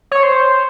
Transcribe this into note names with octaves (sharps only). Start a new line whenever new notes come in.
C#5
C5